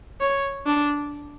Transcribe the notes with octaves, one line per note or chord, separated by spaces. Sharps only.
C#5
D4